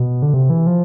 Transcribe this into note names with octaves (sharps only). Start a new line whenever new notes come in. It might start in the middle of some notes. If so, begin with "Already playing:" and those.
Already playing: B2
D3
C3
E3
F3